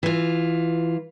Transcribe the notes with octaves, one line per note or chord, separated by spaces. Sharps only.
E3 F4